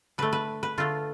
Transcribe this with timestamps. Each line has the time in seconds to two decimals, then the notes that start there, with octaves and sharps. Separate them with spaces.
0.18 D3 A3 B4
0.33 B4
0.63 B4
0.78 D3 A3 F4